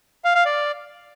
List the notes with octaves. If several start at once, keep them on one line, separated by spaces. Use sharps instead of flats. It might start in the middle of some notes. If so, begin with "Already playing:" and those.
F5
F5
D5